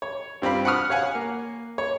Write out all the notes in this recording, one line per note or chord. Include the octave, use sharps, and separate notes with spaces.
C#5
G2 C4 F4 B5
F#5 B5 C#6 D#6 F6
C#5 F5 F#5 G#5
A#3
C#5